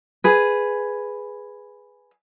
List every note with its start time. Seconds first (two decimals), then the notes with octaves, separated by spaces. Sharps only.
0.24 G#4 B4